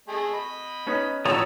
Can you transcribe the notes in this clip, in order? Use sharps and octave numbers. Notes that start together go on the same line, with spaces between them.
A3 G#4 D#5
D#5 B5
B3 C#4 D#4
A2 F3 F#4 C#5 A5 A#5 D#6 E6